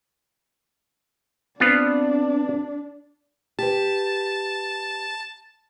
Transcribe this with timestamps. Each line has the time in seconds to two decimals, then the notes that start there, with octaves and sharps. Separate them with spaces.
1.60 B3 C4 D4 F4
3.59 G4 B4 A5